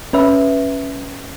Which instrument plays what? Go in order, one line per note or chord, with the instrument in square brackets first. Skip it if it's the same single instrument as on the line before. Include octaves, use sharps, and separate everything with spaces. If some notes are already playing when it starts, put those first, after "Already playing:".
[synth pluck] C#4 B4 E5